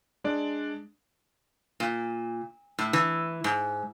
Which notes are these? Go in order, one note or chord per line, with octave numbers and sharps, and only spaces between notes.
G#3 D4 D5
A#2
A2
E3
G#2